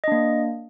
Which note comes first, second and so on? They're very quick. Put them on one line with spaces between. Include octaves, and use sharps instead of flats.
D#5 D4 A#3